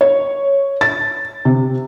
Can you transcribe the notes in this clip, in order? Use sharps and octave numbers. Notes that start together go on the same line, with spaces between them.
C#5
A6
C3